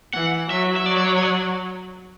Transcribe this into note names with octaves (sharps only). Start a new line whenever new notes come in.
E3 F#5
F#3 E5
E5
F#3 D5
D5
C#5
C#5
D5